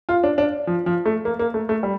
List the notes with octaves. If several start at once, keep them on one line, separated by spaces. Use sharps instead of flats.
F4
D4
D4
F3
F3
A3
A#3
A#3
A3
A3
G3